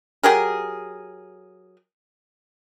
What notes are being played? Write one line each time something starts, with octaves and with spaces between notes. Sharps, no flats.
F#3 G4 G#4 A#4